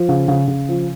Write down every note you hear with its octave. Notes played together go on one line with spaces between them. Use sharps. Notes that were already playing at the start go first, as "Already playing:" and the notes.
Already playing: F3
C#3
C#3
C#3
F3